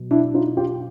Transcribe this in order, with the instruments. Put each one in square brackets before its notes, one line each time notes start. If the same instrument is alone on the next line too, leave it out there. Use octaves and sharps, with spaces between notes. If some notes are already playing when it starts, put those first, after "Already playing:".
Already playing: [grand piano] B2 F#3
D4 E4
D#4 F4
F4 G4